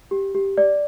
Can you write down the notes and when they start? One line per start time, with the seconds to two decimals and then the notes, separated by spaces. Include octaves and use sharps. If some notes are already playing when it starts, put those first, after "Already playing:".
0.11 G4
0.35 G4
0.58 D5